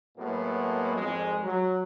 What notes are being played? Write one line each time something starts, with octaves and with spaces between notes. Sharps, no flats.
A2 F#3 G#3 A#3 B3
G#1 F2 G#3
F#3